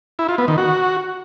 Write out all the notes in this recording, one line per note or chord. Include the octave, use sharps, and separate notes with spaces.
E4
F4
B3
D#3
F#4